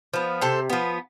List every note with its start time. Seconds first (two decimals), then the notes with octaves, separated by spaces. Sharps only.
0.14 F3 B3
0.41 C3 A4 C5
0.70 F3 B3